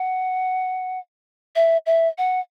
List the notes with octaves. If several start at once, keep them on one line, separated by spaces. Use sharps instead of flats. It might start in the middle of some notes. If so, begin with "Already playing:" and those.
Already playing: F#5
E5
E5
F#5